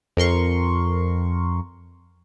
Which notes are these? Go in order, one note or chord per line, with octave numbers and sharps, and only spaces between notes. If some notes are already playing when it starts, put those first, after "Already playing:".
F2 A#4 C6 C#6